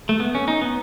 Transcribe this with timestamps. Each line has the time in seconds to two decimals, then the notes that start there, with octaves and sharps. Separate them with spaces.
0.09 A3
0.20 B3
0.35 C#4
0.48 D#4
0.61 B3